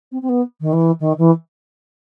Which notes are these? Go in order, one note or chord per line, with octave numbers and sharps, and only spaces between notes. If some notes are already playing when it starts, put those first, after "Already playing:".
C4
C4
B3
D#3
E3
D#3
E3